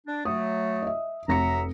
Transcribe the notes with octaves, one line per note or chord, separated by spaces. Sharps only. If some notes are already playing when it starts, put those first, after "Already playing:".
D4
F#3 A3 D#6
D#5 E5
F1 F#3 E5 A#5 A#6 C#7